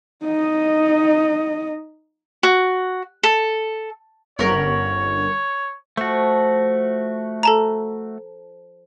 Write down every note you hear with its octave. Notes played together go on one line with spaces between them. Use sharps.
D#4 D#5
F#4
A4
G1 C#4 A#4 C#5 F#5
F3 A3 F#4
A4 A5 A#5